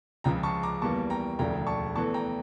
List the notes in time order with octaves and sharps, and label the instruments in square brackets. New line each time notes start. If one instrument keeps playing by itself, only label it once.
[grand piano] C#2 C#3 F3 G5 A#5
A5 C#6
A#5 D6
E2 E3 G3 A#3 A5 C#6
G5 A#5
E1 D2 C#3 F3 G5 A#5
A5 C#6
E2 E3 A3 A5 C#6
G5 A#5